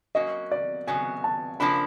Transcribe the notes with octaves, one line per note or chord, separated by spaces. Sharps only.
F#3 A#3 C#4 F#4 D#5
D5
C#3 F#3 B3 G#5
A5
C#3 F3 A#3 D4 B5